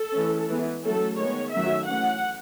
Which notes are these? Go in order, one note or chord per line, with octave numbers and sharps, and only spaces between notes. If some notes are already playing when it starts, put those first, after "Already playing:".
Already playing: A4
E3 A3 C#4
E3 G#3 B3
F#3 A3 C#4 A4
D#3 G#3 B3 C#5
D#3 F#3 A3 C#4 E5
E3 A3 C#4 F#5